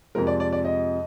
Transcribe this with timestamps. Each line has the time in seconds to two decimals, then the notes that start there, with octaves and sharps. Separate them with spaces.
0.15 F2 C3 F3 G#3 A#4
0.27 D5
0.40 D5
0.53 D5
0.65 D#5